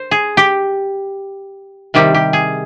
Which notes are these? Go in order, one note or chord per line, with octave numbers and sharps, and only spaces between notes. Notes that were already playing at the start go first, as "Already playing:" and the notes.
Already playing: C5
G#4
G4
C3 D#3 G3 G4
G4
G#4